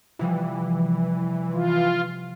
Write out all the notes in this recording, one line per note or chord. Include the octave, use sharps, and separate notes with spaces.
C3 E3 F3 G3
F4